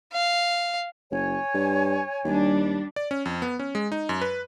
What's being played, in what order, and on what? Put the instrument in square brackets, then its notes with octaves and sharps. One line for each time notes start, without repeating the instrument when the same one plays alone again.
[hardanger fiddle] F5
[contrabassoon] F#1 [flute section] C#5 G#5
[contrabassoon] G2
[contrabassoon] D#2 [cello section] G3 D4
[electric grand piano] D5
C#4
F2
B3
C#4
G#3
D#4
F#2
B4